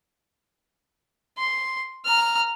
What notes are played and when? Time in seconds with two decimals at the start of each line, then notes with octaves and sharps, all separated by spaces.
1.38 C6
2.05 A#5 F6